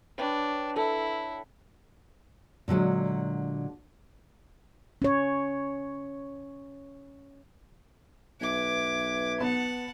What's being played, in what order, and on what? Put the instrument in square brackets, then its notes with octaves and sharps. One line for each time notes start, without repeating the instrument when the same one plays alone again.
[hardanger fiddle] D4 [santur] B4 C#5 G5
[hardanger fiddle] E4 [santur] A4
[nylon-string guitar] A#2 D3 F#3 G#3
[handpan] C#4 C#5
[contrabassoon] B1 [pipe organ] B4 E5 G#6 [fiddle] D6
[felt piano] B3 [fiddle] F#5 A5